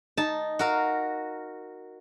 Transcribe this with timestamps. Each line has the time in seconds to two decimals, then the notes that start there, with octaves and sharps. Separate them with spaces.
0.17 D#4 A5
0.59 F#4 A#4 F5